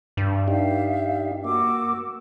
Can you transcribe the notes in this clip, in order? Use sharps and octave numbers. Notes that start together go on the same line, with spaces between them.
G2
D4 D#4 G4 E5 F5
A#3 F#4 D6 E6